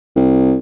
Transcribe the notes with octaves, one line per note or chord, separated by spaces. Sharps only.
C2